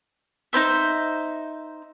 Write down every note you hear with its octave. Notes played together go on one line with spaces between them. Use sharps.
D#4 E4 C5 E5